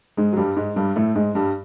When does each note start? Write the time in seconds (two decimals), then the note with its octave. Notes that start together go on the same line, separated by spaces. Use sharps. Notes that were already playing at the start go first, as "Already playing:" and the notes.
0.17 G#2 G#3
0.33 F#3
0.37 G2 G3
0.56 G#2 G#3
0.76 G2 G3
0.96 A2 A3
1.15 G#2 G#3
1.35 G2 G3